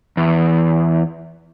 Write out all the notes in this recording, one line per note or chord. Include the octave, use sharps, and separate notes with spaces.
E2